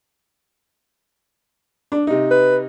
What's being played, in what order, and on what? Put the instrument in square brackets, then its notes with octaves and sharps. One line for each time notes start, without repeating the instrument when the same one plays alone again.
[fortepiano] D4
C3 D#4
[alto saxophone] B4